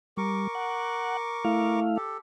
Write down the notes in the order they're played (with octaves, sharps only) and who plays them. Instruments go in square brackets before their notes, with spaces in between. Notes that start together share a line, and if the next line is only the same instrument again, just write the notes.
[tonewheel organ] G3 [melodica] A#4 C#6 D6
[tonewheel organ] F#5
A3 E4 F5
[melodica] G4 A4